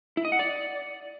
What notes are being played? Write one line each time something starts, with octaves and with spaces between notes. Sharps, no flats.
E4
D#5
F#5
D5